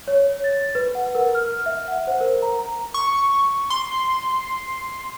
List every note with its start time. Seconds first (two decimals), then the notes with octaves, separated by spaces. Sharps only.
0.08 C#5
0.44 A6
0.75 B4
0.95 F#5
1.15 A#4
1.35 F6
1.66 E5
1.88 F#5
2.07 C5
2.21 A#4
2.42 A#5
2.94 C#6
3.70 C6